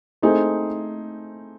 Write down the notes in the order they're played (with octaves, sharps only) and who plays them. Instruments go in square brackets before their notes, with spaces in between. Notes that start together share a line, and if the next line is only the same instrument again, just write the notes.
[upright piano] A3 C4 D#4 G#4